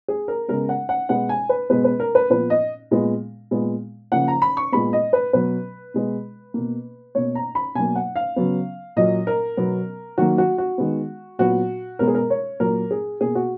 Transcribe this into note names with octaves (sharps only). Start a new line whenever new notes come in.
G#4
A#4
C#3 G#3 B3 A#4
F#5
F#5
B2 G#3 B3 F#5
G#5
B4
B2 G#3 B3 B4
B4
A#4
B4
A#2 F3 B3 B4
D#5
A#2 G#3 B3
A#2 G#3 B3
C#3 F3 A#3 F#5
A#5
B5
C#6
A#2 G#3 B3 B5
D#5
B4
B2 F#3 B3 B4
B2 G#3 B3
B2 A#3
B2 A#3 C#5
A#5
B5
B2 F#3 A#3 G#5
F#5
F5
C#3 F#3 B3
A#2 F#3 A#3 D#5
A#4
B2 F#3 B3
D#3 F#3 A#3 F#4
F#4
F#4
D#3 G#3 B3
A#2 F#3 B3 F#4
B2 G#3 B3 A#4
G#4
A#4
C#5
A#2 F#3 A#3 A#4
G#4
B2 A#3 G#4
F#4